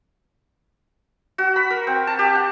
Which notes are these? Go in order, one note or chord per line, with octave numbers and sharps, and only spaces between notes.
F#4
B5
A#4
C4
A5
G4
F#5